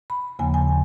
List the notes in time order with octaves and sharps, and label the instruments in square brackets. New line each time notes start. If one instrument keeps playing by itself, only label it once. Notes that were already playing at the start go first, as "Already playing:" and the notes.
[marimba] B5
D#2 C#3 F3 A#3 G#5
G#5